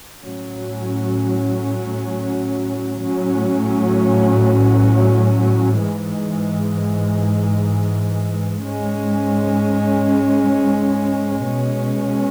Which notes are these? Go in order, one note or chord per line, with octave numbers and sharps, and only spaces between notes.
A2 F#3 C#4
A2 F#3 C#4
G#2 E3 G#3
G#2 G#3 C#4
B2 G#3 C#4